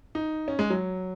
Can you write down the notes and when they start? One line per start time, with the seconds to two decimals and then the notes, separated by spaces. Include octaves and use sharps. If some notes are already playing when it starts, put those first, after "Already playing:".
0.15 D#4
0.48 C#4
0.59 G#3
0.70 F#3